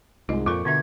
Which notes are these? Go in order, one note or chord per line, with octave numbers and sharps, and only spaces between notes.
C2 G#2 G#3 F4 D#5
F2 A#2 F4 A4 A#4 C#6 D6
B2 D3 D4 E5 G#6